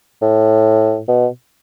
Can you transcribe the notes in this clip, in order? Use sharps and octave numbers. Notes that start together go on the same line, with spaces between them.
A2
B2